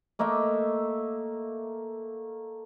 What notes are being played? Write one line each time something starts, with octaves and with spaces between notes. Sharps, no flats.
A3 A#3 D#5 E5